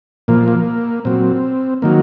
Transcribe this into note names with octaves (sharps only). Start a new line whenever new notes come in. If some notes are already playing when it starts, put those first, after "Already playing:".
A#2 F3 A#3
A#3
A#2 F#3 C4
D#3 F#3 A#3